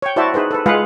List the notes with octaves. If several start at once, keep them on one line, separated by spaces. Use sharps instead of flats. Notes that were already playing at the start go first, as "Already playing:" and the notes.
C#5 G5
E4 F#4 C5 D5 E5 A5
D#4 G#4 B4 C5
A4 B4
G#3 F4 G#4 B4 F5 F#5